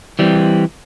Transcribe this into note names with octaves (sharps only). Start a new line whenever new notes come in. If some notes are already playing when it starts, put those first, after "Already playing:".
E3 G3 C4